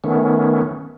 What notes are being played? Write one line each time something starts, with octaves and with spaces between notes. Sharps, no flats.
D#3 A3 B3 C#4